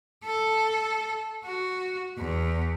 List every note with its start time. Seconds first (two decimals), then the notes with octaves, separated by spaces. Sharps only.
0.25 A4
1.44 F#4
2.18 E2